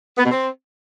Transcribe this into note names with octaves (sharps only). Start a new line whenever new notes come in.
B3
B2
C4